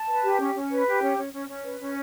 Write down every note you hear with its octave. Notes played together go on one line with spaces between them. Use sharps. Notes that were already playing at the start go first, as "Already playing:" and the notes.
Already playing: A5
B4
G4
C#4
C#4
B4
G4
C#4
C#4
C#4
C#4
B4
C#4